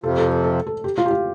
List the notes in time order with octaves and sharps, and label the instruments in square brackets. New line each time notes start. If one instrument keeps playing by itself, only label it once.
[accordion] F2 C3 F3 [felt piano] A4
[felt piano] A4
A4
A4
G4
F4
G4
F4